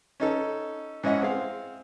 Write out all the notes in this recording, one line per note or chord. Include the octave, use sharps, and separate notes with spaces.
C#4 D#4 A4
G#2 C#4 E4 D#5 F#5
C4 G#4 F5